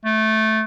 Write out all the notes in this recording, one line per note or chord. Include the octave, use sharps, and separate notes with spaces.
A3